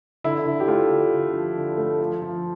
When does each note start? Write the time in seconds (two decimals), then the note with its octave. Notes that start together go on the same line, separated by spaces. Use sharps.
0.24 D3 E4
0.47 D3
0.60 G4
0.68 A3 F4
0.89 D3
1.12 D3
1.34 F3
1.56 D3
1.78 A3
2.00 F3
2.22 F3